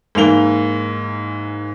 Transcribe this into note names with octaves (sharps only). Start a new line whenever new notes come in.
G#2 E3 A#3 F7 G7